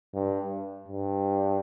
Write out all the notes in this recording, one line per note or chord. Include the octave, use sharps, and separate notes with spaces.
G2
G2